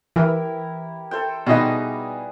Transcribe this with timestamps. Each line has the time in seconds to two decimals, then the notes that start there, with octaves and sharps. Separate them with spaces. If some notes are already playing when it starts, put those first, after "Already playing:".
0.16 E3 E4 G4 A#4
1.11 A4 C5 G5
1.46 B2 G3 D#4 G#4 B4